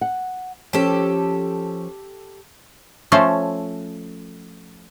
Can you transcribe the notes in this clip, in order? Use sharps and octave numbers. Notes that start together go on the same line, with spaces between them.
F#5
F3 C#4 G4 A4
F3 A3 C#4 A4 C5